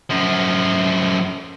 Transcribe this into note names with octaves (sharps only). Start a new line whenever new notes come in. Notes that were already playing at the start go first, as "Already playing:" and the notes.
F#2 F3